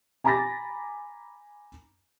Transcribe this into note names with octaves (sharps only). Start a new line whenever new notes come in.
G#5 A#5 B5 D6 A6 A#6